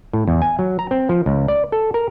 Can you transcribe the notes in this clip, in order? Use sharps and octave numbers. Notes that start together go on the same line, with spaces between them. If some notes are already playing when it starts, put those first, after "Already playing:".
A2
E2
G#5
F#3
A#5
C4
F3
C#2
D5
A4
A#4